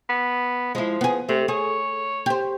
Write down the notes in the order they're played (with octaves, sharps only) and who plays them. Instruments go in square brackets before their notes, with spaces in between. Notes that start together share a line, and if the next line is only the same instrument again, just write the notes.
[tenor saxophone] B3
[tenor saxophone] F3 [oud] G#3 E4
[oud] B3 G#4
[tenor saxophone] C3 [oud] A3
[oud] G#4 [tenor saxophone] C#5
[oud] G4 C5